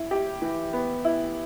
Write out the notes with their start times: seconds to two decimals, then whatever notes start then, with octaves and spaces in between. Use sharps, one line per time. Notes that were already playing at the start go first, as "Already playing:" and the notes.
Already playing: E4
0.11 G4
0.42 E3
0.73 B3
1.05 E4